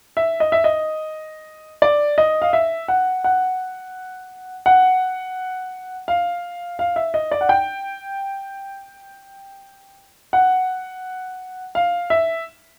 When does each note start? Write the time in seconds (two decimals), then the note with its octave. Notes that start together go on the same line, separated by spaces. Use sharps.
0.17 E5
0.40 D#5
0.52 E5
0.64 D#5
1.82 D5
2.18 D#5
2.42 F5
2.53 E5
2.88 F#5
3.24 F#5
4.66 F#5
6.08 F5
6.79 F5
6.96 E5
7.14 D#5
7.32 D5
7.41 F#5
7.49 G5
10.33 F#5
11.75 F5
12.10 E5